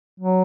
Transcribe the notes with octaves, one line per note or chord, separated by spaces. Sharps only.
F#3